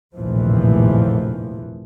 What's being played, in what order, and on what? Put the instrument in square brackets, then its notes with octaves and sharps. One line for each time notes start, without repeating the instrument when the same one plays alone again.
[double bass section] F1 A#1 D#2 A2 E3 F3